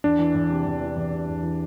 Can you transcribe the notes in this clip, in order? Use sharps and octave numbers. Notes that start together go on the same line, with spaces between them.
E2 D4
E3
E2
C3
E2
E3
E2
C3
E2
E3